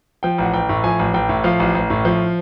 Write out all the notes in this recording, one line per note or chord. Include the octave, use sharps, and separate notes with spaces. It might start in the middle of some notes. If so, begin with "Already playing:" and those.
F3 G5
A1 F#5
A1 G5
A2
F3 G#5
A1
A1 G5
A2
F3 F5
A1
A1
A2
F3